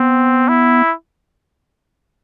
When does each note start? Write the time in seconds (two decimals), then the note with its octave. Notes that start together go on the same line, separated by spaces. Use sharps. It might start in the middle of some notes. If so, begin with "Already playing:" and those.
Already playing: B3 C4
0.49 E4